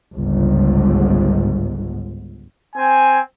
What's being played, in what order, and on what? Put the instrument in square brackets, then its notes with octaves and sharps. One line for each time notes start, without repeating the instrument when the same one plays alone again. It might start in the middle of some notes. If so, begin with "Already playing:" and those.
[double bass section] G1 C#2 G#2
[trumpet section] C4 G#5